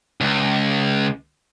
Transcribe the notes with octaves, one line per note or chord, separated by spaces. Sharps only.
C#2